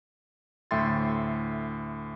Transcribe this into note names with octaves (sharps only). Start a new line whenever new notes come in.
D2 A2 E5 G5 C6 A6